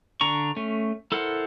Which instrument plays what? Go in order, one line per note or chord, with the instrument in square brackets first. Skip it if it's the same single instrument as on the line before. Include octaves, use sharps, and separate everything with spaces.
[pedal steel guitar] D3 D4 A#5 C#6
A3 C#4
E4 A4 A#4 C5 F#5